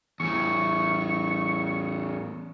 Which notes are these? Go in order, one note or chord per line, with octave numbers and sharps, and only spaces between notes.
E2 A2 C#6